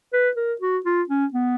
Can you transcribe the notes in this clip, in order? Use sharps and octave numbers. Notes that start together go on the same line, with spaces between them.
B4
A#4
F#4
F4
C#4
B3